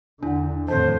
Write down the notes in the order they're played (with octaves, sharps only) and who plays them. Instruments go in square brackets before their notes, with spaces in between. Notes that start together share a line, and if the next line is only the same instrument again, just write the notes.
[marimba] E2 F#5 [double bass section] D3 [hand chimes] D4 E4
[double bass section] F2 A2 [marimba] D#3 [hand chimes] C4 A4 A5 [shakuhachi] C5